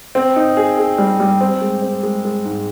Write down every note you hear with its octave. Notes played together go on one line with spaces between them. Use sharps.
C4
D#4
G#4
G#4
G3
G3
C4
G#3
C4
G#3
G#3
G#2